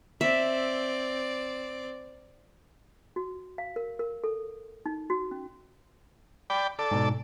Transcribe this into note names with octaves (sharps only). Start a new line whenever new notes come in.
C4 D5 E5
F#4
F5
A#4
A#4
A4
D#4
F#4
C#4
D5 G5 B5
A4 D5
G#2 B2